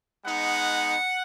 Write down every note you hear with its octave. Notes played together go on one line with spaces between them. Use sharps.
G#3 B3 D#4 F#5